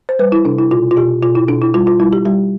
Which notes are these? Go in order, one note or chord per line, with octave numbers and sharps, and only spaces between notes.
C5
G3 B4
E4
C3 D4
E4
B2 F4
F4
B2 G4
B2 F4
E4
B2 D4
E4
G3 F4
F4
G3 E4
G4
G3 G4